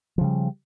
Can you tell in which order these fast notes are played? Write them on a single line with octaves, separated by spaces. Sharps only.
F3 C#3 G3